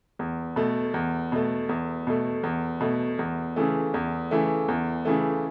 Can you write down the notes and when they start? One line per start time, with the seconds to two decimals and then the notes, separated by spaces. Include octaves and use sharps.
0.19 E2
0.56 B2 A3
0.94 E2
1.32 B2 A3
1.69 E2
2.07 B2 A3
2.43 E2
2.81 B2 A3
3.19 E2
3.56 C#3 E3 A3
3.94 E2
4.31 C#3 E3 A3
4.68 E2
5.05 C#3 E3 A3